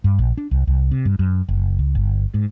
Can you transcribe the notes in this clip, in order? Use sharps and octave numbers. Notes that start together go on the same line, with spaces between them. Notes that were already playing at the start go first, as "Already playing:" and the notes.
G2
A#1
D4
C2
C2
C3
G2
F#2
F#1
C#2
G1
G#2